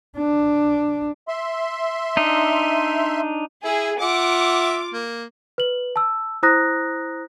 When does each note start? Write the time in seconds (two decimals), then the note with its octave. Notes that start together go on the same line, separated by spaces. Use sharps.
0.18 D4
1.28 E5 C6
2.17 D4 D#4
3.64 E4 G#4
4.01 F4 E5 F#5 D6
4.93 A#3
5.58 B4 F#7
5.96 A5 E6
6.43 E4 C5 A#5 D#6 F#6 A#6